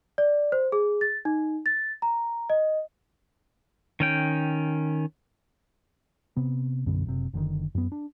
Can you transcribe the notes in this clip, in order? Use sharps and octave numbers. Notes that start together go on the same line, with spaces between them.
D5
C5
G#4
A6
D#4
A6
A#5
D#5
D#3 C#4 G5
C3 B3
B1 F#2 D3 B3
F#1 C3
F#1 D3 D#3
F#2 B3
D4